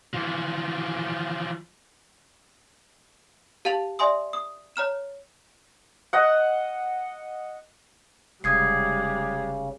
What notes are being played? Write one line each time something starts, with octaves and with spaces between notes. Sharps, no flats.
E3 F3
G4 F5 A5 A6 F7 F#7
D5 E5 G#5 C6 D#6
D#6
C#5 A#5 F6 E7
D#5 F#5
F1 C#3 G3 G#3 D#6 G#6 C7